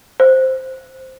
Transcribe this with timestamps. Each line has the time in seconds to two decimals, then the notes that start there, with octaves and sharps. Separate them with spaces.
0.20 C5